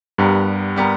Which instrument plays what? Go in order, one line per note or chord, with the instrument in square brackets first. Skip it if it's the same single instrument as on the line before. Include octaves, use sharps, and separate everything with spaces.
[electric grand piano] G2 [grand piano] G3 B3 G4 A#4
[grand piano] G3 B3 G4 A#4